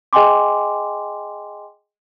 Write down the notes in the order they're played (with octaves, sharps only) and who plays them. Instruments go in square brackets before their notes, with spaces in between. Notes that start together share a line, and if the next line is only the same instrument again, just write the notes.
[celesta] G#4 D#5 G5 G#5 C6 D6